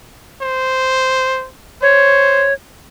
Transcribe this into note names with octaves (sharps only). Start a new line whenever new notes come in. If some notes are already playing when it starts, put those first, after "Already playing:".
C5
C5 C#5